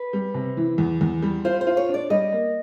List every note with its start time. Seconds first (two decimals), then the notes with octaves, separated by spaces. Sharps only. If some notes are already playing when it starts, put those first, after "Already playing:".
Already playing: B4
0.13 G3
0.34 C3
0.57 E3
0.78 E2
1.01 E2
1.22 G3
1.45 F4 C5
1.61 C5
1.67 F4
1.77 C#5
1.89 D4
1.94 D5
2.10 G3 D#5
2.32 A#3